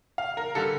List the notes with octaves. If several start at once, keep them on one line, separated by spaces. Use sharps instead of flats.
F5
A#4
D3 G3 A4